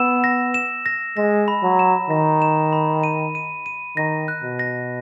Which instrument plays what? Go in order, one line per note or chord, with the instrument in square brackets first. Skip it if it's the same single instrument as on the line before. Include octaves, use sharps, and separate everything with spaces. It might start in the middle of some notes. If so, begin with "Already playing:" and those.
Already playing: [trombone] B3 [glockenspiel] E6 E7
[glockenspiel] A#6
E7
A#6
[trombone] G#3 [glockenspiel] A#6
[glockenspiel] B5
[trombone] F#3
[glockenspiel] E7
[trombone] D#3 [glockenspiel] A#6
[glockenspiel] E7
B5
D#7
D#7
D#7
[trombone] D#3 [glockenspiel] A#6
[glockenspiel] F#6
[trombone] B2
[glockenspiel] A#6